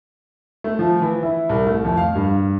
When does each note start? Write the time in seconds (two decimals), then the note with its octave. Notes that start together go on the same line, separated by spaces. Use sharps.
0.64 A3
0.79 F3
1.02 E3
1.23 E4
1.49 C2
1.67 A3
1.85 F2
1.97 F5
2.15 G2